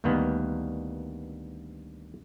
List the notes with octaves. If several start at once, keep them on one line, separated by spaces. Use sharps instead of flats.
D2 G2 D#3 A#3 B3